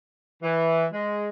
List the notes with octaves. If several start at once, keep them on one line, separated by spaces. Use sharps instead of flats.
E3
G#3